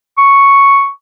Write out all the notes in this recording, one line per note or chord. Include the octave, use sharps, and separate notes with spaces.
C#6